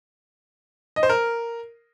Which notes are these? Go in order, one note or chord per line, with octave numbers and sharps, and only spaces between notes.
D#5
C5
A#4